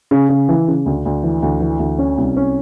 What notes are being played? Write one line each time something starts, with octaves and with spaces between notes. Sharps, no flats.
C#3
C#3
E3
C#3
D2
D2
E3
D2
E3
D2
C#4
C2
C#4